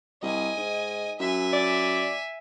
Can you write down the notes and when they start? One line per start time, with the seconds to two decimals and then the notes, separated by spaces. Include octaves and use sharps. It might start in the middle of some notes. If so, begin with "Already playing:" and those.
0.22 C2 D#5 G#5
0.57 G#2
1.20 F#2 E5 G#5
1.53 D5